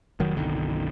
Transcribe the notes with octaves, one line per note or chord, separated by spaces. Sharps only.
F1 D#3 F#3
F#1 B1 D3 D#3